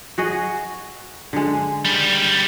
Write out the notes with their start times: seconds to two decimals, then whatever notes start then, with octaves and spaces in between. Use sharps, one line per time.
0.18 F#4 G#4 D#5
1.33 D3 G#3
1.85 D#3 G3